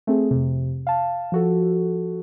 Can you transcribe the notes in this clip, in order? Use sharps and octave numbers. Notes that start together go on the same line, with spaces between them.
A3 C4 G#4
F2 C3
F5 A5
F3 F#4 A4